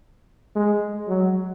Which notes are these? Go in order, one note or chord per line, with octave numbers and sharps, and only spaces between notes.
G#3
F#3